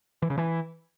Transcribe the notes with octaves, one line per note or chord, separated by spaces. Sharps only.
E3
C#3
E3